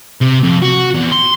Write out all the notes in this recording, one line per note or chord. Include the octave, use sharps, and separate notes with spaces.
C3
F2
F#4
E2
C6